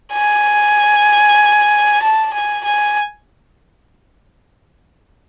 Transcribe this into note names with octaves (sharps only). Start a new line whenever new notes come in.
G#5
A5
G#5
G#5